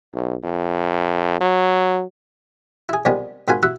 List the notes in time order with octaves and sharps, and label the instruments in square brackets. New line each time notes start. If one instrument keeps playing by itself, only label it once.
[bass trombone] B1
F2
F#3
[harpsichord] E4 G#4
F2 C3 D#3 G3 G#3 B3
G#2 D#3 F4 F#4 G#5 B5
E4 F#4 E5 F#5